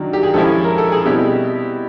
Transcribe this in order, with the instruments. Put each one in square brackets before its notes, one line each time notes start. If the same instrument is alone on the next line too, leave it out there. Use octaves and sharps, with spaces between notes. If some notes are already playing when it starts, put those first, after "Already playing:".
Already playing: [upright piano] D#3 F#3 A#3 D4
G4
G#4
F3 G#3 C#4 E4 A4
A#4
A4
G#4
B2 G3 C4 E4 G4